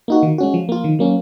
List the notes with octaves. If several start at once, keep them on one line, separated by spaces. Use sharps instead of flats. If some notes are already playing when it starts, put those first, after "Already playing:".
A#3 D#4 F#4
D#3
G#3 C#4 F#4
F3
A#3 F4
D#3
F#3 A#3 C#4